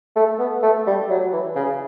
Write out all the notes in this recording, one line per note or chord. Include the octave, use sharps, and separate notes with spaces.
A3
B3
A3
G3
F#3
E3
C#3